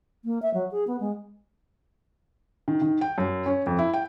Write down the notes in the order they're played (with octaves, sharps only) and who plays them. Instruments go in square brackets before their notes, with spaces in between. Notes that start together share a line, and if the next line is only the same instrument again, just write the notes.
[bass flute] A#3
E5
F#3
G#4
B3
G#3
[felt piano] D#3
D#3
G5
F#2
C#4
F2
E4
G5